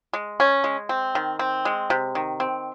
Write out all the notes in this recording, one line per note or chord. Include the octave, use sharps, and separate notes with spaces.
G#3
C#4
G#3
C4
D#3
C4
G#3
C3
D#3
C4